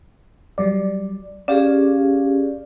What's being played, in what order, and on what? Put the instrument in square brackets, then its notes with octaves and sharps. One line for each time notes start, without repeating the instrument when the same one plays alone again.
[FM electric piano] F#3 G3 D5
[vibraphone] C#4 G4 G#4 [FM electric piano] D5 F5